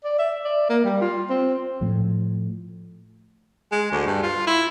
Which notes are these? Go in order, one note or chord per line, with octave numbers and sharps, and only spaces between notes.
D5
E5
D5
A#3
G3
F4
C4
A2 F3
G#3
D2
G2
F4
E4